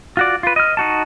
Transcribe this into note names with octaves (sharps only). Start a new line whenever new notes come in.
F4 F#4 D5
F4 B4
D#5 F6
D#4 F#4 A5